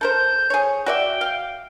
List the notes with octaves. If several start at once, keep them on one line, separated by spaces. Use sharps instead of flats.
A4 A#4 C5 G6
G#4 C#5
F#4 D5 E5 G5
F5